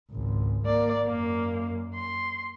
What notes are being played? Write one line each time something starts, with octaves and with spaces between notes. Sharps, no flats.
G#1 C#2
A#3 D5
F#2 A#3
C6